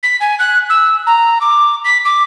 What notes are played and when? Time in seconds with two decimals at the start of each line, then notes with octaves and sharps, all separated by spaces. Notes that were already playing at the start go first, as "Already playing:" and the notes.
0.03 B6
0.20 G#5
0.39 F#6
0.70 E6
1.07 A#5
1.41 D6
1.85 B6
2.05 D6